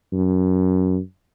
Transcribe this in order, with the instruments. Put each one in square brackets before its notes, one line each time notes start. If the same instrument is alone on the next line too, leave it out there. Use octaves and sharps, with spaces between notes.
[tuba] F#2